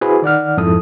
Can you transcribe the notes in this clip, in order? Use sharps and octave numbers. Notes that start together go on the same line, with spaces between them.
E4 F#4 G#4 B4 C5
D#3 D5 F#5 F6
F2 G#2 E4 A4 D#6